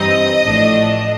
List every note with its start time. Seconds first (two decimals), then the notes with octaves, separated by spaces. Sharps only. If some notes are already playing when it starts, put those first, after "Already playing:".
Already playing: G2 E3 G3 C4 D#4 D#5
0.42 A1 A2 F3 A3 D4